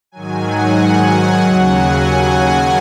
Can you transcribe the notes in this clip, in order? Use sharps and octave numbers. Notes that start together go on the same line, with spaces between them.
G#2 D#3 F#3 G#5
F#5
D#2 C#3 F#3 F#5
G#5